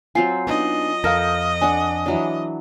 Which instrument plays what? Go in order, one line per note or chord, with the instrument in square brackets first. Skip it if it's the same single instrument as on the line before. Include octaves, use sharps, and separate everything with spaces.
[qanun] F#3 C4 F4 [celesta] G#5 C7
[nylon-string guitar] B3 D4 D#4 [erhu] D#5
[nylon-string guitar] F2 A#4 A5 [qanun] A4 G5 [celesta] F5 F6 A#6
[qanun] D4 F#5 [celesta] G#5
[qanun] E3 F#3 D4